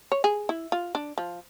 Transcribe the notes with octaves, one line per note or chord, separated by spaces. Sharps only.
C#5
G#4
E4
F4
D4
F3